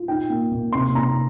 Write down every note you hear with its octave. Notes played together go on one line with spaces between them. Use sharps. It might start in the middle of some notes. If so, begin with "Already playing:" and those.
Already playing: F4
D#4 G5
A#3
A#3
C3 C6
C3 A#5